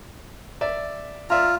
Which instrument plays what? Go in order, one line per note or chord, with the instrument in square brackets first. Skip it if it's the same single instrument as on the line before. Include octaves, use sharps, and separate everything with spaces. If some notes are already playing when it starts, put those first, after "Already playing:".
[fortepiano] D5 E5
[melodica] F4 [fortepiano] D5 E5 A#5